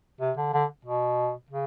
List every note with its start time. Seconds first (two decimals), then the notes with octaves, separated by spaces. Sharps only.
0.21 C3
0.37 D3
0.53 D3
0.85 B2
1.51 C#3